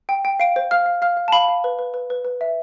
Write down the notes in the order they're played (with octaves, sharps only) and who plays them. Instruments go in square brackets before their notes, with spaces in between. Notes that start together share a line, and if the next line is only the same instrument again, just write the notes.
[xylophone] G5
G5
F5 D7
C5
F5 F6
F5
F5 F6
F5
A5
F5 B5
F5
B4
B4
B4
B4
B4
E5